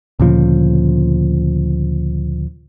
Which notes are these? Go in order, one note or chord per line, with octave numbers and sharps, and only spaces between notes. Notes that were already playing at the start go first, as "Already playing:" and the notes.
D2 A#2 C#3 F3